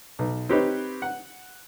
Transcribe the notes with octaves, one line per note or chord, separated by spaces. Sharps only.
B1
C4 D#4 G4 B4 C#5 D#5
F#5